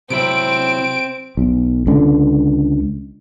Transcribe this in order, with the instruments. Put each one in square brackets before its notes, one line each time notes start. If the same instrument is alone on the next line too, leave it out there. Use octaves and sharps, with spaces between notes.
[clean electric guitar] C3 F#3 E4 [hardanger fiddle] C4 [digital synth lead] D7
[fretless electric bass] B1
C#2 D3